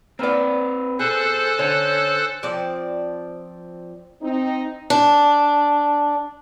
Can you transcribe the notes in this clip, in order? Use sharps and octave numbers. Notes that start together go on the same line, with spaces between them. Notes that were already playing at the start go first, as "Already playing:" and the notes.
A#3 C4 B4 D5
B2 G#4 A4 C5 F#6
D3 C#5 G#5
F3 C4 D5
C4 D#4
D4